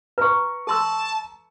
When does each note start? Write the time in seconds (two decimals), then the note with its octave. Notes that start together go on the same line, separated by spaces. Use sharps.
0.18 B4 A#5 C#6
0.67 A4 A5 C6 E6